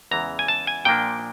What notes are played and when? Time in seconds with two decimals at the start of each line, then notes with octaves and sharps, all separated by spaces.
0.11 E2 C#3 E3 G#3 A#5
0.39 G#5
0.48 A5
0.67 G#5
0.85 A#2 F3 A#3 D4 G5